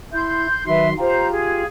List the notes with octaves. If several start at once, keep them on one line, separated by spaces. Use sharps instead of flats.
E4 C6 G6
D#3 F#3 B4 E5 C6
F4 G4 C5 A#5
G#4